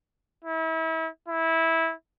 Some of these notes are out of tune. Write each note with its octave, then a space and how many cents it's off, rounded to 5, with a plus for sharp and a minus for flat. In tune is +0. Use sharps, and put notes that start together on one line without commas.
E4 -35
E4 -15